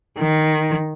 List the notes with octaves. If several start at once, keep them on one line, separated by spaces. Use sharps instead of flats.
D#3